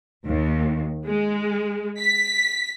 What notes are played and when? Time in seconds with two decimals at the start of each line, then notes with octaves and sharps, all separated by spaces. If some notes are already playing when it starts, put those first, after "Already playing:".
0.25 D#2
1.05 G#3
1.99 B6